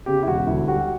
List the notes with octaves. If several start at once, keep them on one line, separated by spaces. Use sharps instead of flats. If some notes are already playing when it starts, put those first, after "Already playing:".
C#3 G4
E4
E1 F#4
D2 E4
G3 F#4